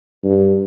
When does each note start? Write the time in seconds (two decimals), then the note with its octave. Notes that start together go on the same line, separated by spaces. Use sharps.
0.24 G2